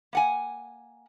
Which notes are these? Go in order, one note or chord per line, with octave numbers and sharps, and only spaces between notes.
A#3 F#5 G#5